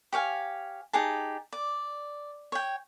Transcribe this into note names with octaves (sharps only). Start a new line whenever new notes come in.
G4 C#5 F5 G#5
D#4 G4 G#4 A5
D5
C#5 G5